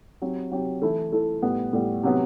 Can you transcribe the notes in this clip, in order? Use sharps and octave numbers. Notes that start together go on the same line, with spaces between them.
F#3 C4 G4
F#3 C4 G4
E3 A3 E4 A4
E3 A3 E4 A4
A2 G3 B3
A2 G3 B3
C3 F#3 B3